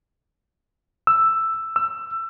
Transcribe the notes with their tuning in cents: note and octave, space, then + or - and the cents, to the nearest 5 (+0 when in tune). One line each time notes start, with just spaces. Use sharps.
E6 +5
E6 +20